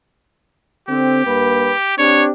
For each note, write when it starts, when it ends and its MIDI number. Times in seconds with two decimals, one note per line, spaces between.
0.88 1.21 50
0.88 1.21 60
0.88 1.95 67
1.25 1.72 43
1.25 1.72 58
1.25 1.72 71
1.98 2.31 60
1.98 2.31 62
1.98 2.31 67
1.98 2.24 73